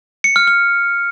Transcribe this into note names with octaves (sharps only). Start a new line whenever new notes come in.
C#7
F6
F6